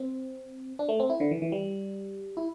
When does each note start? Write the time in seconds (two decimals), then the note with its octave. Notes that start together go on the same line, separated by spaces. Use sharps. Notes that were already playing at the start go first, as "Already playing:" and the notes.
Already playing: C4
0.79 D4
0.89 A3
1.00 C4
1.10 E4
1.20 D3
1.31 E3
1.42 E3
1.52 G3
2.37 E4